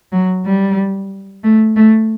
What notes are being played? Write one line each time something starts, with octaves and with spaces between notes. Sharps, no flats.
F#3
G3
A3
A3